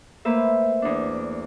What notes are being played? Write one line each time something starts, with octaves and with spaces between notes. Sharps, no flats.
A3 A#3 B4 C5 E5
E2 D4